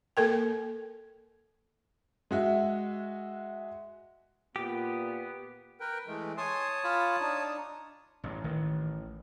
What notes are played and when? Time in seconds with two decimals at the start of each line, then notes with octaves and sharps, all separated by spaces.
0.17 A#3 A4 A#4 G5
2.31 G#3 F#4 E5
4.56 A#2 B3 G4
5.80 A#4 B4 G5
6.07 E3 G#3 A3
6.38 C#5 G#5 A5 C6 D#6
6.84 F4 F5 B5
7.21 D4 D#4
8.24 A1 G2
8.44 A1 D#3